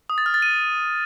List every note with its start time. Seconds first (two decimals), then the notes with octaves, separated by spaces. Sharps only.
0.10 D#6
0.18 A6
0.26 F6
0.34 A6
0.42 D#7